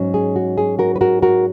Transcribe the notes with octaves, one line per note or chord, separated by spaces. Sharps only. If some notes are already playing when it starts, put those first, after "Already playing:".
Already playing: G#2 F#3 C#4
G#4
F#4
G#4
F#4 A#4
B4
F#4 A#4
F#4 A#4